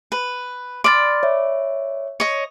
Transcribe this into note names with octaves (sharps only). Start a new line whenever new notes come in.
B4
D5 B5 C6 F6 A6
C#5 E5
C#5 D#5